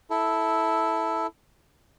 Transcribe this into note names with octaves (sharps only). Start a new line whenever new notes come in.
E4 A4